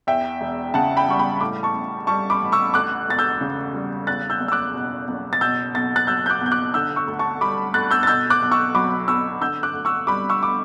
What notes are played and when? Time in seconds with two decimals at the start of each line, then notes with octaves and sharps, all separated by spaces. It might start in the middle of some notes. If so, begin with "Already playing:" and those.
0.07 E2 E5 G5
0.41 E1
0.74 C#3 F#5 A5
0.97 G5 B5
1.08 G3 C#6
1.19 G5 B5
1.41 A2 B5 D6
1.63 A5 C#6
1.74 A1
2.07 G3 A5 C#6
2.30 B5 D6
2.41 A1
2.52 C#6 E6
2.74 D2 D6 F#6
3.08 E1 A6
3.18 E6 G6
3.41 C#3
3.74 G3
4.07 E2 F#6 A6
4.30 E6 G6
4.40 F#1
4.48 E6
4.52 D6 F#6
4.74 B2
5.08 F#1
5.33 A6
5.41 B2 E6 G6
5.74 B1 A6
5.96 F#6 A6
6.07 F#3 E6 G6
6.26 G6
6.30 D6 F#6
6.41 B1
6.46 G6
6.52 D6 F#6
6.74 D3 E6 G6
6.96 C#6 E6
7.07 D2
7.19 A5 C#6
7.41 G3 B5 D6
7.74 D2 F#6 A6
7.91 E6 G6
8.03 A6
8.07 B2 E6 G6
8.30 D6 F#6
8.42 B1
8.52 C#6 E6
8.75 F#3 B5 D6
9.07 B1 C#6 E6
9.41 D3 E6 G6
9.63 D6 F#6
9.74 D2
9.85 C#6 E6
10.07 G3 B5 D6
10.29 C#6 E6
10.43 D6